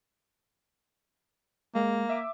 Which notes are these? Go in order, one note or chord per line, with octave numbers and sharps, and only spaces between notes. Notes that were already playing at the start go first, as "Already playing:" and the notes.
G#3 A#3
E5 D6